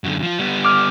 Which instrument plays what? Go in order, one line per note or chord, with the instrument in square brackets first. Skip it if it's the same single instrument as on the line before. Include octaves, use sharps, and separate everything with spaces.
[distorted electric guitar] F#2 D3
F3 F4
G3 B3
[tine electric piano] D6 F6